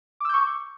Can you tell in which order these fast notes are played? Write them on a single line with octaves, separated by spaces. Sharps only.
D6 E6 G6 C#6